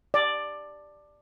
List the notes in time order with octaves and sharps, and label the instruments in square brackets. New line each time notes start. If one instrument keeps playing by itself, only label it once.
[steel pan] D5